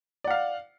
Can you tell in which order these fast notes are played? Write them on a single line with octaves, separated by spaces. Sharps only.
D5 F#5 F5